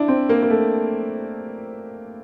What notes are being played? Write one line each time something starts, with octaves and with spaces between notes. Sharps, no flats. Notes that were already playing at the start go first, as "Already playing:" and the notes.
Already playing: D4 E4
C4
A#3
A#3
A3